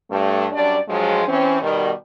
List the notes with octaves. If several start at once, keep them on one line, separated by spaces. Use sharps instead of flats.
G2 A3
F#2 G3 D4 D5
G2 F3 F#3 G#3
E3 C4 C#4
B2 D#3 G3